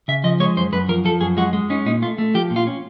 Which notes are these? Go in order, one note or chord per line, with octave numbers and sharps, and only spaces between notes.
C#3 E5
F3 D#5
G#3 C#5
F#2 C5
F#2 B4
F3 A#4
F3 A4
F#2 G#4
G#3 F#4
G#3
C#4 D#4
A#2 D#4
A3 F4
A3
F3 G4
A#2
F4
C#4